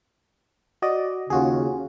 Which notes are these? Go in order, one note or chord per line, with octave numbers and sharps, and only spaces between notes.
F#4 D5 D#5
D#2 C#3 F4 F#4 G#4